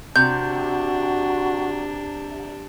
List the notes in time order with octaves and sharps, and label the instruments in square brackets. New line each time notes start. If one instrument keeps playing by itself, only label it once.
[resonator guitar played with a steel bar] C3 [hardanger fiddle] D4 [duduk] F#4 [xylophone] G6